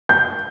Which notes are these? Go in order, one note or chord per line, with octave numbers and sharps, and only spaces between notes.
G6